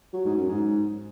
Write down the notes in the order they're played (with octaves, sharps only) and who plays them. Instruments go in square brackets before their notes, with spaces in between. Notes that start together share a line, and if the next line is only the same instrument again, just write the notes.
[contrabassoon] F#3
G#2
F#2
G#2